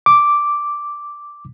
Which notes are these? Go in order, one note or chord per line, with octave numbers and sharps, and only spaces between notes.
D6